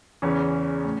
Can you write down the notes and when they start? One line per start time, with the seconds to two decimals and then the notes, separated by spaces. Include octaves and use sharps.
0.22 E2 C#3 E3 C#4
0.84 A2